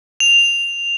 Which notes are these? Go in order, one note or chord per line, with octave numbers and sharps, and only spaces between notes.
F7